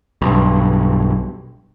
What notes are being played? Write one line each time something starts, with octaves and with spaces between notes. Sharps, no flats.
B1 G2